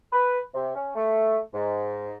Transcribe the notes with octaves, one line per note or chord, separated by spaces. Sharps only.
B4
C3
C#4
A3
G#2